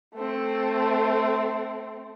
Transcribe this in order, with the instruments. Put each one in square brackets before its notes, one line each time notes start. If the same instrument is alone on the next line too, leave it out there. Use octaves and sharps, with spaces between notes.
[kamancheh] A3 C4